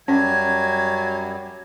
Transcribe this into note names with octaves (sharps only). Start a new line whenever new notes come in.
F#2 F#3 G3 C#4 G#6